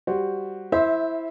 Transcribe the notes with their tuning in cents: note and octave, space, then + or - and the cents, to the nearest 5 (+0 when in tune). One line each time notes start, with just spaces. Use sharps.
G3 +0 F#4 +0 C5 +0
E4 +0 C5 +0 E5 -25